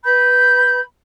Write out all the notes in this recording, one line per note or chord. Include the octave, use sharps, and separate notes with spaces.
B4 B5 G6